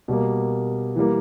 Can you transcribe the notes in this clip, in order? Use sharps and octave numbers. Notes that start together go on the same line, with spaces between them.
B2 G3 A#3
E3 G3 A#3